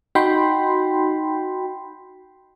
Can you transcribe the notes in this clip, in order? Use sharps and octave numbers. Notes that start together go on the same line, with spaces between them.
D#4 F#4 G5 B5 C6